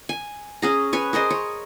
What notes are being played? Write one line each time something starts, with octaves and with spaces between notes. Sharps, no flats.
G#5
C#4 G#4 A#5
B4 C#5 G#5
G#4 A#4 C5 D#5
C#5